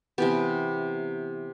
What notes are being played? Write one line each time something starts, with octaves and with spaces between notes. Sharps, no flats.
C3 E3 B3 G4